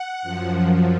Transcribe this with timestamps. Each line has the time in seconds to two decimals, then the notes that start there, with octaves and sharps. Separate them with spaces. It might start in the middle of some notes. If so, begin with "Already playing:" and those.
Already playing: F#5
0.22 F#2 F3